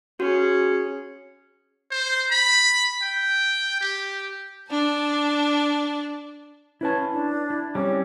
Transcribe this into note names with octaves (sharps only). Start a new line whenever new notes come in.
C#4 F#4 G#4
C5
B5
G5
G4
D4 A5
C#4 E4 B4 A5
D4
E4
G3 C4 C#4 C#5